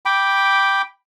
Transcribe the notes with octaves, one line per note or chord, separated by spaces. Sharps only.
G5 B5 D6